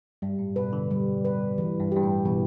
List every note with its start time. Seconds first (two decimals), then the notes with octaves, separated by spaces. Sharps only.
0.22 G2 G3
0.39 A2
0.56 B2 B4
0.73 D3
0.91 G3
1.25 B4
1.58 E3
1.80 G2
1.92 G2 G4
2.04 A2
2.25 B2 E3